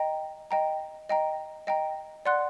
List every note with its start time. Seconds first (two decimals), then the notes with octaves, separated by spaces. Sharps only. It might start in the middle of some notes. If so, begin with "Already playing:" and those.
Already playing: D#5 G5 A#5
0.51 D#5 G5 A#5
1.09 D#5 G5 A#5
1.67 D#5 G5 A#5
2.26 D5 F#5 C6 F#6